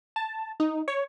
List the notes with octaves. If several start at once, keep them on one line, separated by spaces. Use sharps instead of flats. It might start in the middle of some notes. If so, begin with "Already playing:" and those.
A5
D#4
C#5